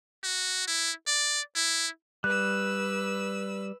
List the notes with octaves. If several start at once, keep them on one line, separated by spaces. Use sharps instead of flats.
F#4
E4
D5
E4
G3 B4 E6 F#6